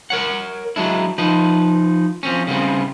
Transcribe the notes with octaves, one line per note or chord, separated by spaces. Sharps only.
A#4 C#5 F#5
F#3 G#3 D4 E4
F3 D#4 B4
F3 C4 C#4
C#3 G3 B3 C4